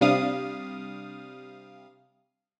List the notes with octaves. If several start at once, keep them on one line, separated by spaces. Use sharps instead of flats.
C3 G3 D4 F5 D#6